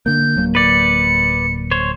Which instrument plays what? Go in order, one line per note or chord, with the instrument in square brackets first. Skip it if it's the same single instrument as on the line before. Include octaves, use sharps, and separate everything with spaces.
[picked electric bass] D3 A#3 [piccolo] G6
[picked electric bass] D1 F#3 A#3
[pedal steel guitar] B4 D5 [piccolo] C#7
[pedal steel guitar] C5 C#5